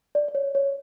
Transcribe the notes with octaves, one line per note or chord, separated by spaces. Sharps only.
D5
D5
C#5
C#5